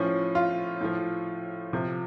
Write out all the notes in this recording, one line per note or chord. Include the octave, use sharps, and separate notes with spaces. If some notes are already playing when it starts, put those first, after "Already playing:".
Already playing: A2 F3 C#4
F4
A2 F3
C3 F3